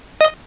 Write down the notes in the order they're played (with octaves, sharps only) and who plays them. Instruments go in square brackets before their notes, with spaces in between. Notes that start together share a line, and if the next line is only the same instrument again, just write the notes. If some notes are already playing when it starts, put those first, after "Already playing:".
[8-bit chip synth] D#5